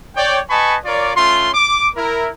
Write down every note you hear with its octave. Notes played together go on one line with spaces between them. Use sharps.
C#5 D5 G5
B4 D#5 G#5 A5 B5 C#6
F4 A#4 C#5 D5
A3 C#4 F4 C6
D6
E4 A#4